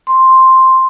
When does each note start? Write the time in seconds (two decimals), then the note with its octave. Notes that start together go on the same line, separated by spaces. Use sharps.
0.07 C6